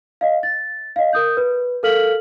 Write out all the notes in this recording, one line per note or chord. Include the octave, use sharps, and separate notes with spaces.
D#5 F5
A6
D#5 F5
A#4 D#6 G6
B4
A4 A#4 F5 F6 B6 F#7